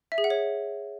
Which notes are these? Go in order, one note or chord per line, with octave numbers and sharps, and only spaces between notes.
E5
G#4
F#5
C#5